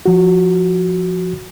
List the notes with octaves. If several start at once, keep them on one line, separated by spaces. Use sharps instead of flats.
F3 F#4